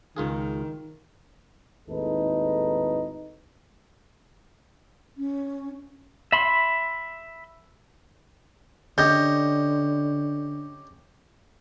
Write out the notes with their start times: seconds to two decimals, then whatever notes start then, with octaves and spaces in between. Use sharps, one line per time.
0.16 C#2 D#3 F4 G#4
1.88 G#1 D#2 A2 D#4 A4 B4
5.18 C#4
6.32 E5 B5 C6
8.98 D3 C#4 G4 D#5 G6